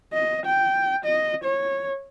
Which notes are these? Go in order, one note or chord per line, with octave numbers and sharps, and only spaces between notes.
D#5
G5
D#5
C#5